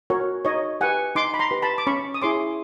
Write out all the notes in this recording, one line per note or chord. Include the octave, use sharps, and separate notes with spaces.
F#4 A#4 C#5
D#4 C#5 D#5
G4 B4 F#5 G#5
D#4 C6 D6
B5
A#5 C6
G4 B4
A5 B5
D6
C#4 B5 C#6
D#6
E4 G#4 C#5 C6 D6